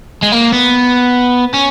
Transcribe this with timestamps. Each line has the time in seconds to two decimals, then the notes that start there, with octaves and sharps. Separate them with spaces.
0.22 G#3
0.32 A#3
0.52 B3
1.54 C#4